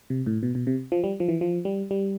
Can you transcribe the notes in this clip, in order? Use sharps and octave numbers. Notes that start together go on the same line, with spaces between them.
C3
A2
B2
B2
C3
F3
G3
F3
E3
F3
G3
G3